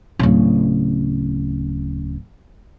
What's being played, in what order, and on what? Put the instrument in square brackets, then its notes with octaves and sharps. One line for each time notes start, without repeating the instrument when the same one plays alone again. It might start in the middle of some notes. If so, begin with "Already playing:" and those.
[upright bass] D1 C#3